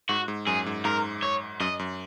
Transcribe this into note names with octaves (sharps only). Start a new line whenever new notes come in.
G#2 F#4
G#2
F#2 G#4
G#2
G#2 A#4
C#5
F#2 D#5
F#2